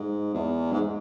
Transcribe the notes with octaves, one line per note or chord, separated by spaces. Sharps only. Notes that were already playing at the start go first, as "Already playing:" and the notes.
Already playing: G#2
E2
G#2